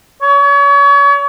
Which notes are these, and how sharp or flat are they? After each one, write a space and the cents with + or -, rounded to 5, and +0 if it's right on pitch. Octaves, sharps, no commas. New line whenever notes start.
C#5 +35